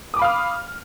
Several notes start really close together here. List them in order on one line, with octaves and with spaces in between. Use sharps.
D#6 D6 B5 F5 F6